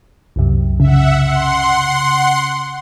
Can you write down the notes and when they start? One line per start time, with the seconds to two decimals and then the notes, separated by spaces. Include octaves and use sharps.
0.36 C2 F#2 C3
0.80 C#3 E5 F#5
1.21 F#5 C6